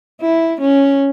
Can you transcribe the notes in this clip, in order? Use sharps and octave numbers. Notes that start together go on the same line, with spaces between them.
E4
C#4